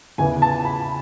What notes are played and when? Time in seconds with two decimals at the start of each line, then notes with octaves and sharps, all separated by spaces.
0.18 E2 C#3 E3 B3 G#5
0.42 A5
0.65 B5